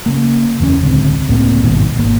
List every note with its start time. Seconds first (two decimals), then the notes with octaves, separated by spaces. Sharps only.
0.06 C#3 A#3
0.60 F#1 E2 D#3 C#4
0.83 D1 C#2 D3 C4
1.28 C#2 A2 A#3 C4
1.63 G#1 G2 B2 D#3
1.97 G#1 A#3